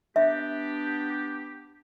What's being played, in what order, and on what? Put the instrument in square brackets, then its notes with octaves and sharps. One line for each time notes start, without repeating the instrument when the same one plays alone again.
[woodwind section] B3 D4 G4 [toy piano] E5